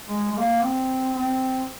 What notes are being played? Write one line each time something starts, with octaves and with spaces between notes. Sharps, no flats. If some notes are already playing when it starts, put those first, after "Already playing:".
G#3
G#3
A#3
C4
C4